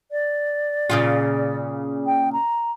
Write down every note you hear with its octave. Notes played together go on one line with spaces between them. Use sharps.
D5
A#2 C#3 F4
G5
A#5